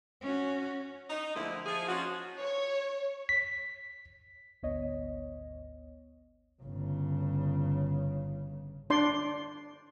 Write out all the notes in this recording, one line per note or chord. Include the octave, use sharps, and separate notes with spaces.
C#4 F#4
D#4
D2 D3 F3 G#3 A#3 E4
F3 G#4
F3 C#4 D#4 F4 F#4
C#5
B6
G#1 D2 B3 C#5 D#5
G1 C#3
D4 D5 C6